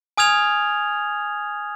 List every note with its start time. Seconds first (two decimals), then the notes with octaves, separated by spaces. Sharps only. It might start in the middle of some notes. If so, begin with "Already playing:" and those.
0.18 G#5 D#6 F6 G#6 F7